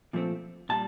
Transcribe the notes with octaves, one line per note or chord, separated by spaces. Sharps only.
A#2 F3 A3 C4
A#2 G3 A5